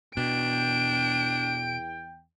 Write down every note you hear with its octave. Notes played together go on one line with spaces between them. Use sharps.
E2 B2 D4 G5 D7